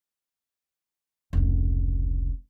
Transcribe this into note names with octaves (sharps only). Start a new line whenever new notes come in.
F1 C#2